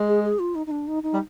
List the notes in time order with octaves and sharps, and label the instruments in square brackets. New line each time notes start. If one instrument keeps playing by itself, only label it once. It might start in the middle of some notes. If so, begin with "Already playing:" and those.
Already playing: [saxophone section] G#3
[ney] G#4
G#4
F4
D#4
D#4
D4
D#4
D#4
[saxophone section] G3